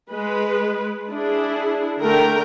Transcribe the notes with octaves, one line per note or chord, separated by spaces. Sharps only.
G#3 B4
D4 E4 G#4
D3 A3 A#4 G5 A#5